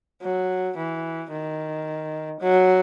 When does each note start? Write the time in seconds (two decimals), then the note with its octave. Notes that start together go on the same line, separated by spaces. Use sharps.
0.22 F#3
0.77 E3
1.31 D#3
2.40 F#3